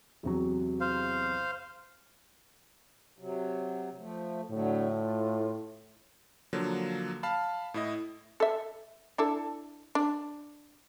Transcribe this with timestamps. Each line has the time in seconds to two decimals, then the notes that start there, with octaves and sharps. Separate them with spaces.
0.23 E2 C3 F#3
0.80 C5 F5
3.19 C3 F#3
3.98 F3 A3
4.51 A2 D3 F#3 A3
5.01 F4
6.53 D3 F3 F#3 A#3
7.23 F5 A5 B5
7.74 A2 E4 D#5
8.40 A4 E5
9.18 D4 E4 A4
9.95 D4